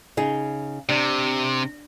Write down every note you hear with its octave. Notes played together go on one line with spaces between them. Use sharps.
C#3 D#4 G#4
C3 D4